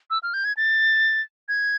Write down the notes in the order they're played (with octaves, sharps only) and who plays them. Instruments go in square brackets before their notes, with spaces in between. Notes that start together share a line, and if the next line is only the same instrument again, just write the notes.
[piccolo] E6
F6
G6
G#6
A6
G#6